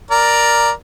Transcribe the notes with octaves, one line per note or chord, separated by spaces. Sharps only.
A#4 D5